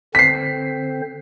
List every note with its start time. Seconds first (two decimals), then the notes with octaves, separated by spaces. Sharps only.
0.15 D3 C4 C5 B6 C7